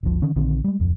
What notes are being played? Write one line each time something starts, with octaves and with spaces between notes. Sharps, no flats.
F#1 C#2 F3
D3 D#3 C#4
A#1 D3 D#3 C4
G3 G#3
D1 F2